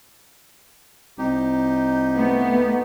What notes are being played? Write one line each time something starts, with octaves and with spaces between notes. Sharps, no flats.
C2 D#4 G4
A3 B3